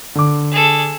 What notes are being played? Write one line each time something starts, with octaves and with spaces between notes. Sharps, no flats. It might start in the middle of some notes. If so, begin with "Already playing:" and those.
D3 D6
G#4 A4